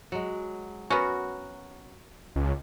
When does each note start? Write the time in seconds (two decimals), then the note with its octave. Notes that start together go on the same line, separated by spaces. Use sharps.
0.12 F#3 G#3
0.90 B3 C#4 F#4 A#4
2.36 C#2